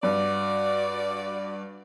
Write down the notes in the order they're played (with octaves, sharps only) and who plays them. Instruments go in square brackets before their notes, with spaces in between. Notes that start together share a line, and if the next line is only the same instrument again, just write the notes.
[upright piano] G2 [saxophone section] F#4 D5